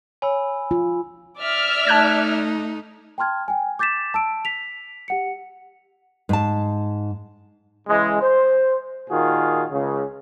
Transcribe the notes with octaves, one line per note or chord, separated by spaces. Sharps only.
C#5 G#5 B5 E6
F4
D5 E5 F6
A3 D#4 A5 F#6 G#6
G5 A5 C6 F6 G#6
G5 G#5
D6 G6 A6 B6 E7
A5 E6 D7
B6 F7
G4 F#5 C#7
G#2 A5
C#3 E3 G#3
C5
A#2 D#3 F4 F#4 G#4
C#2 C#3